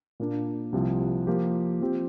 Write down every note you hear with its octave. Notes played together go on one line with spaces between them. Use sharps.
A#2 A#3 D4
C2 C3 F3
F3 A#3 G4
F3 C4 G4